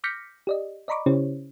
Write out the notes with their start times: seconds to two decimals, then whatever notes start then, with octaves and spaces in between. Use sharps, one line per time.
0.04 D6 F6 G6 A#6 B6 C#7
0.47 G4 D5 D#5
0.88 D5 D#5 A#5 B5 C#6 D6
1.06 C#3 C#4 E4 G4 C5 C#5